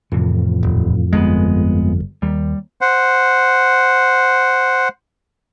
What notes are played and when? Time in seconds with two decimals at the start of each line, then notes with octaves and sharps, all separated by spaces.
0.12 F2 A2 C3 E3
0.63 D#1
1.13 G1 G#3 A3 B3
2.22 D#2 G3
2.81 C5 F#5